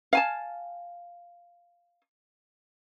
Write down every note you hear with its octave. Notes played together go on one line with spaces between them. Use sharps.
F5 G#5 A5